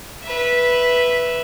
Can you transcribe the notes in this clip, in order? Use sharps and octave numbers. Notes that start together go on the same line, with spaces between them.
B4 E5